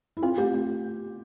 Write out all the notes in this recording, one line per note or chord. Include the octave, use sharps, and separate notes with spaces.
E4
C4 F4
A3 G4
A3